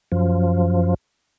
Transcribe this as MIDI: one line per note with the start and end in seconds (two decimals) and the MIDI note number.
0.12 0.94 42
0.12 0.94 53